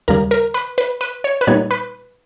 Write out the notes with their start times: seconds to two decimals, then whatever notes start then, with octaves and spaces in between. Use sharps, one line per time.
0.08 D#2 C#3 G3 A#4
0.31 A#4
0.54 B4
0.78 B4
1.01 B4
1.24 C#5
1.41 B4
1.47 A#2 G3 B3 D#4 C#5
1.71 B4